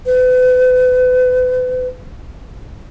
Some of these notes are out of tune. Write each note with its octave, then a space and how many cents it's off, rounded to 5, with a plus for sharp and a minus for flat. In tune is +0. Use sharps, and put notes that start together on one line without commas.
B4 +40